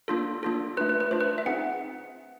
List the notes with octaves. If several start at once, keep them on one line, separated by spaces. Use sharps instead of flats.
A#3 D4 F4 A4
A#3 D4 F4 A4
A3 D4 F4 B4
B4
B4
A3 D4 F4 C5
B4
E5
C4 D#4 G#4 F#5